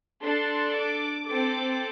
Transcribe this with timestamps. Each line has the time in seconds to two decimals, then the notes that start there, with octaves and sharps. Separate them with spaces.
0.22 D4 A4 C6
0.75 D6
1.27 C4 A4 D6